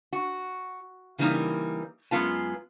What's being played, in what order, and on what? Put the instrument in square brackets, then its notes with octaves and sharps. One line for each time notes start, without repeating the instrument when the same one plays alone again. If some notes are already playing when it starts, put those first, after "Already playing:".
[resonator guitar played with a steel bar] F#4
C#3 E3 G3 A#3 D#4
F#2 G#3 B3 F4 A5